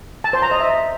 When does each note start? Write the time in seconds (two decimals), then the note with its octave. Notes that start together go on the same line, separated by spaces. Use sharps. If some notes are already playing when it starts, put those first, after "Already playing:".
0.24 A5
0.33 C5
0.42 A#5
0.51 D#5
0.60 E5